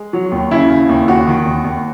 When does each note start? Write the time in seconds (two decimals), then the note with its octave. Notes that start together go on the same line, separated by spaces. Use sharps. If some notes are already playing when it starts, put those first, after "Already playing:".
Already playing: G#3
0.13 F#3
0.32 D#2
0.51 C#3 E4
0.70 C#3
0.89 D#2
1.08 D#2 F#4
1.27 D#3
1.46 D#2
1.64 D#2